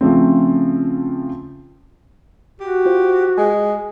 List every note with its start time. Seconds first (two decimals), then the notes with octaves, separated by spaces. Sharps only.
0.01 C#3 F3 A3 C4
2.60 F#4 G4
2.86 F4 C5
3.38 G#3 G#5